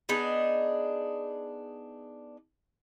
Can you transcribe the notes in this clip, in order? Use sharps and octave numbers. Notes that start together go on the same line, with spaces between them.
B3 D4 D#4 G#4